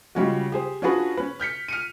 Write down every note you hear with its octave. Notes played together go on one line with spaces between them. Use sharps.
C#3 G3 G#3 C#4 F4 F#4
G4 G#4 C5
C#4 D4 F4 F#4 G#4 B4
C#4 B4
F6 G6 B6 C#7
F6 C#7 D#7